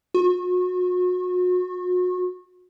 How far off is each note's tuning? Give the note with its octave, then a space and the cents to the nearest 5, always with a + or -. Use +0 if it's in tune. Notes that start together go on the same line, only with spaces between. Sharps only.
F#4 -35